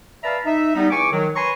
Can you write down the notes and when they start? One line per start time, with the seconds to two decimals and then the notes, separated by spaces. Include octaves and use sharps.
0.23 B4 D5 E5 F5 A5 A#5
0.45 D#4 E5
0.75 G3 B3 D#4
0.91 E2 G#5 C#6 D6
1.11 D#3 F#3
1.36 B4 C#5 G#5 A#5 C6 C#6